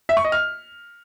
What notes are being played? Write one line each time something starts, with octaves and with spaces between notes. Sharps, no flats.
E5
C#6
D#5
F6